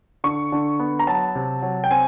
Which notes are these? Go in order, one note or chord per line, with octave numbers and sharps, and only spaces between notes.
D3 C#6
D3
B3
A#5
F#3 A5
C3
F#3
G5
C4 G#5